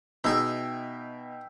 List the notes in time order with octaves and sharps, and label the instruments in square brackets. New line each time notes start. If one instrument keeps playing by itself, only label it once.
[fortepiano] B2 [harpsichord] D#4 G#4 [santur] E5 G5